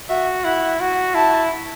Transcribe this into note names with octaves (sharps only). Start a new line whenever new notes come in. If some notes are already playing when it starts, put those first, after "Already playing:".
F#4 E5
E4 F#5
F#4
E4 A5